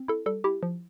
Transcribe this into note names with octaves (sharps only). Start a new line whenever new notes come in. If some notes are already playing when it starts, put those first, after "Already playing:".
Already playing: C4
E4 A4
G3 A4
E4 G4
F3